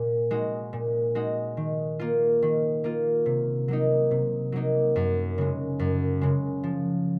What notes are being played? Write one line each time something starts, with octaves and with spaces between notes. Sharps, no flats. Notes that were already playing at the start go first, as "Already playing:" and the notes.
Already playing: A#2
G#3 D#4 F#4
A#2
G#3 D#4 F#4
D#3
A#3 F4
D#3
A#3 F4
C3
F#3 A#3 D#4
C3
F#3 A#3 D#4
F#2
C#3 G#3
F#2
C#3 G#3
F3